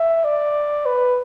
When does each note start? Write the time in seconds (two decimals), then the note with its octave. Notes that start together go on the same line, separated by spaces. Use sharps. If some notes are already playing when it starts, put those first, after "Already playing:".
Already playing: E5
0.25 D5
0.86 B4